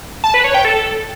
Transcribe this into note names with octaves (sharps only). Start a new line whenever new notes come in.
A5
B4
C#5
G5
A4